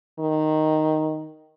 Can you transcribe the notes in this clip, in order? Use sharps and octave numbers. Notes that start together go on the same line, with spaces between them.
D#3